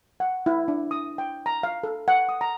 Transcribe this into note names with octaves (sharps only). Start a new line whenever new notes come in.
F#5
E4
D4
D#6
G5
A#5
F5
A4
F#5
D#6
A#5